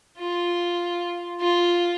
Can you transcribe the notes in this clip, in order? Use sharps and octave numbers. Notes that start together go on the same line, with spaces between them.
F4
F4